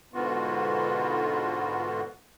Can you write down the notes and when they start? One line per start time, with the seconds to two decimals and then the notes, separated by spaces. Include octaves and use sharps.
0.14 G#2 B2 D3 B3 F4 F#4